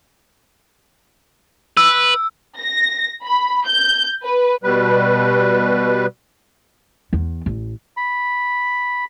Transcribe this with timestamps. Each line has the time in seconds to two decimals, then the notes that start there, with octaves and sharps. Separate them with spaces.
1.77 B4 E6
2.57 A#6
3.24 B5
3.67 G6
4.25 B4
4.63 B2 G3 B4
7.13 E2
7.46 A1
7.97 B5